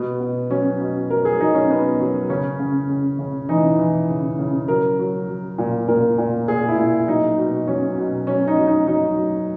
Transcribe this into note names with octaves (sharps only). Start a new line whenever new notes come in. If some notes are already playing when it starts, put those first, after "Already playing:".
Already playing: B2 B3
B2
F#3 C#4
B2
F#3 A#4
G#4
F#3 D#4
C#4
B2 B3
F#3
C#3 C#4
C#3
C#3
C#3
E3 D#4
E3
C#3
C#3
F#3 A#4
F#3
F#3
A#2
A#2 A#4
A#2
A#2 G#4
E4
A#2
F#3 D#4
B2
F#3 C#4
B2
F#3 C#4
D#4
F#3
D#4
F#3 D#4
F#3